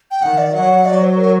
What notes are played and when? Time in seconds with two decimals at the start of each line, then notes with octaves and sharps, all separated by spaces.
0.11 G5
0.22 D#3 F#5
0.38 D5
0.53 F#3 F#5
0.85 F#3 D5
1.01 C5
1.17 A#4